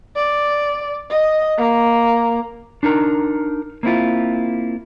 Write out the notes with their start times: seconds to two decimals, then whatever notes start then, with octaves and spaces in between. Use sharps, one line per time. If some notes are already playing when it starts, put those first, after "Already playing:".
0.17 D5
1.11 D#5
1.58 A#3
2.83 D4 D#4 A#4 A#5
3.83 A#3 C4 E4 F4